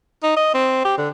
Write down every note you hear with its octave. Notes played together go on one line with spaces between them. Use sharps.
D#4
D#5
C4
G4
D3